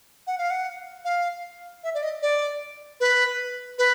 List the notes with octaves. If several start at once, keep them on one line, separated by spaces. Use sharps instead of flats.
F#5
F5
F#5
F5
E5
D5
D#5
D5
B4
B4